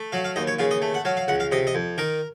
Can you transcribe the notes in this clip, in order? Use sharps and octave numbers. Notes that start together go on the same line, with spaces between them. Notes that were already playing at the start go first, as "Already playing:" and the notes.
Already playing: A3
F#3 F5
F5
D#2 D#5
C#5
C#3 F4
D#5
A3
F#5
F#3 F5
F5
C#2 F#5
F5
C3 D#5
D#5
F2
D#3 A#4